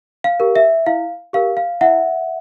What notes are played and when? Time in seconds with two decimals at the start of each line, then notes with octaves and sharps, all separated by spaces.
0.24 F5
0.40 G4 A#4
0.56 E5
0.87 E4 F5
1.33 G4 A#4 F5
1.57 F5
1.81 E4 E5 F#5